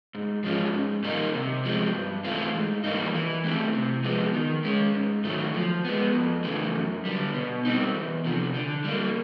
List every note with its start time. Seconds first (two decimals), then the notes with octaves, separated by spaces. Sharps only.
0.15 G#2
0.44 F3 G#3 C#4 F4
0.74 G#2
1.04 D#3 G3 A#3 D#4
1.34 C3
1.65 F3 G#3 C4
1.95 G2
2.24 E3 A3 C4 F4
2.55 G#2
2.84 E3 G3 A#3 D#4
3.15 E3
3.44 A3 C4 E4 G4
3.75 C3
4.04 F3 G#3 B3
4.34 D#3
4.64 G#3 C#4
4.95 G#2
5.25 D#3 F#3 A3
5.54 F3
5.84 G#3 B3
6.15 F2
6.44 C#3 E3 A3
6.75 F#2
7.05 D3 G3
7.34 B2
7.65 G3 C4 D#4
7.95 E2
8.25 C3 F3
8.54 D3
8.84 G3 A#3